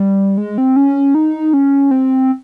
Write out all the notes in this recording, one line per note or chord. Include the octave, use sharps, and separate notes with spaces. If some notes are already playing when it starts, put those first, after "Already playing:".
Already playing: G3
G#3
C4
C#4
D#4
C#4
C4